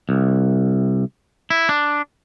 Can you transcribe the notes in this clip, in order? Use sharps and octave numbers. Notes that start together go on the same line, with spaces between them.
C2
E4
D4